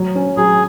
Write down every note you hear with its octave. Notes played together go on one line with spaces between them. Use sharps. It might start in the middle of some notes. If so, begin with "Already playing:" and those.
Already playing: F#3
C#4
F#3 G#4